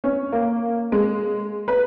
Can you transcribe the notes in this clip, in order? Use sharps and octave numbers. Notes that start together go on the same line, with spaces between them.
C#4
A#3
G#3
B4